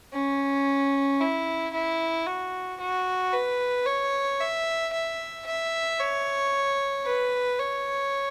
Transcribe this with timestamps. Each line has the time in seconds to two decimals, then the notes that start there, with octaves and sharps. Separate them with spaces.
0.13 C#4
1.20 E4
1.73 E4
2.27 F#4
2.80 F#4
3.33 B4
3.86 C#5
4.40 E5
4.93 E5
5.46 E5
5.99 C#5
7.05 B4
7.59 C#5